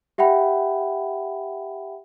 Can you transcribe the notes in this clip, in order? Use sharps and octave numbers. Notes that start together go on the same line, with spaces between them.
G4 E5 F#5 G5 B5